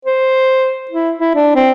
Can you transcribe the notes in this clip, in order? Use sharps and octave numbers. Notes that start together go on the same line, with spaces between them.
C5
E4
E4
D4
C4